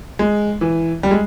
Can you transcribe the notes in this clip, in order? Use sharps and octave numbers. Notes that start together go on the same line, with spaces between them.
G#3
E3
G3
G#3